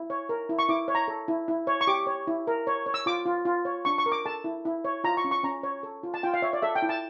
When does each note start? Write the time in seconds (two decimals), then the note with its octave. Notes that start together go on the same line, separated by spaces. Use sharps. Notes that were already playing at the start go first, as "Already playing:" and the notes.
Already playing: E4
0.10 C#5
0.29 A#4
0.49 E4
0.59 C#6
0.69 E4 D6
0.88 C#5
0.95 A#5
1.08 A4
1.28 E4
1.48 E4
1.67 C#5
1.81 C#6
1.87 G4 D6
2.07 C#5
2.27 E4
2.47 A#4
2.67 C#5
2.86 C#5
2.94 E6
3.06 F4 D6
3.26 F4
3.45 F4
3.65 C#5
3.85 D4 C#6
3.98 C#6
4.06 A#4
4.12 D6
4.26 A4 A5
4.44 E4
4.65 E4
4.85 C#5
5.04 F4 A#5
5.17 C#6
5.24 C#4
5.31 C#6
5.43 C#4 A#5
5.63 C#5
5.83 A4
6.03 F4
6.14 A5
6.23 F4 G5
6.34 F5
6.42 C#5 E5
6.53 D5
6.62 A4 E5
6.75 G5
6.82 E4
6.89 A5